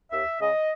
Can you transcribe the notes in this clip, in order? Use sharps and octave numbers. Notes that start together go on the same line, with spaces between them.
D#2 E5
C#3 G#3 C#4 D#5